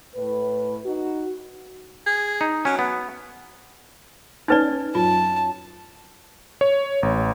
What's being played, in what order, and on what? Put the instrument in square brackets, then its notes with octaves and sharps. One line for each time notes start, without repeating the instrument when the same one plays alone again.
[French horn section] A2 B4
D#4 F#4
[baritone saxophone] G#4
[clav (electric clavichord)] D#4
[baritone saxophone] F#3 [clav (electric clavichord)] C#4
[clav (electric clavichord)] B3
[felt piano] C#4 A5 A6 [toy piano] D#4 B4 D5
[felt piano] F#2 [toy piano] F4 [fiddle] A5
[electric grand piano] C#5
A1